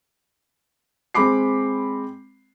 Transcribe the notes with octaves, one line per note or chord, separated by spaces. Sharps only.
G#3 C4 B5 D6 C7